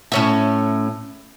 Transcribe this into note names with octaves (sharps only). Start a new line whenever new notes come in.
A2 C#4 E5